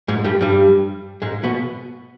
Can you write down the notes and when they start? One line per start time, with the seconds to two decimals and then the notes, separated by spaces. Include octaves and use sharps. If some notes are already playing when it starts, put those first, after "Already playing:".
0.08 G#2 G#3
0.24 G2 G3
0.41 G2 G3
1.22 G#2 G#3
1.44 B2 B3